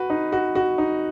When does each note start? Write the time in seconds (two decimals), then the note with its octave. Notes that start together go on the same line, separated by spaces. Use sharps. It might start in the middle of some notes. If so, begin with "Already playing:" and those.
Already playing: F#4 B4
0.10 D#4
0.32 F#4
0.55 F#4
0.78 D#4